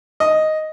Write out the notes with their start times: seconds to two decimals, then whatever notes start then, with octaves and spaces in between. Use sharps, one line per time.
0.20 D#5